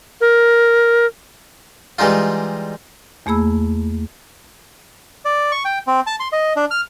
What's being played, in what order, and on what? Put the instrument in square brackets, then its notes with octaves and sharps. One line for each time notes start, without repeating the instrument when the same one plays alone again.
[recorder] A#4
[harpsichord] E3 G3 G#3 D#4 F4
[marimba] E2 A3 A#3 G#4 B5 E6
[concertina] D5
C#6
G5
C4
A5
C6
D#5
D4
F6